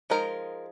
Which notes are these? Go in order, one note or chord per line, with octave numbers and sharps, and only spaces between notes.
F3 G#3 D#4 A#4